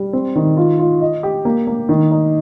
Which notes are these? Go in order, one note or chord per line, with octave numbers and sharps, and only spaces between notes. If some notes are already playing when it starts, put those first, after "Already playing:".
Already playing: G3
C4
D#3
F4
F4
D#5
G4
A#3
A#3
D#3
D#4